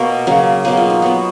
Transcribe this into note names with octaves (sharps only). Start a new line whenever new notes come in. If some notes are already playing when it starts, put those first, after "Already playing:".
Already playing: B2 A#3 A#4 C#5
C#3 F#3 A#3
B2 F#3 A#3 G#4
F4
D#4
B2 F#3 B3 F#4